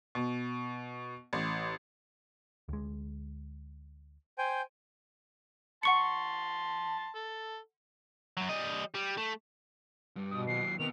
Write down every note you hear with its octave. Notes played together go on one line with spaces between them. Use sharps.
B2
A1
D2 G#3
C5 G5 G#5
F#5 A5 C6 C#6 C#7
A4
F#2 F#3
G3 D#5
G3
A3
G2 G3
B2 D#6
D#2 F#3 C7
C3 D#3 B3 F7